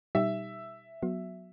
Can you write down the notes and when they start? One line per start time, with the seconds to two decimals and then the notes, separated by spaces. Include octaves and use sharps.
0.15 B2 G3 D#4 G4 E5
1.02 F#3 B3 F#4